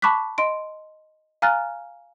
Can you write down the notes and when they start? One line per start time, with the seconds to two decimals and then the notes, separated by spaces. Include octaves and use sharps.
0.02 A5 B5 C#6 D6 F#6 B6
0.38 D#5 C6 D7
1.42 F5 G#5 A#5 F6 F#6 A6